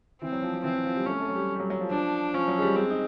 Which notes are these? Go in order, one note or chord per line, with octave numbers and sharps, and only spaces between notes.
E3 C4
F#3
F3
F3
E3 C4
F3
F3
G3
A3 C#4
A3
F#3
G3
G3
F#3
F#3
F3
F3 D4
F3 C#4
F#3
G#3
G3
G#3 C4
D#4